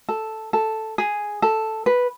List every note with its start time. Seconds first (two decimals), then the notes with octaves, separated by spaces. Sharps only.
0.09 A4
0.53 A4
0.98 G#4
1.42 A4
1.86 B4